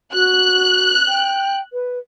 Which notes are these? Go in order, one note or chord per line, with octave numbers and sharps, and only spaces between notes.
F#4 F#6
G5
B4